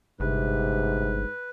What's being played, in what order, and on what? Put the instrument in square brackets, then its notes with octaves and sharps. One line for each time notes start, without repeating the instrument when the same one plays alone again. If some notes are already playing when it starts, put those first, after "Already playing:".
[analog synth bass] G1 [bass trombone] G#2 [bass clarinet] C3 [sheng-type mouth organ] B4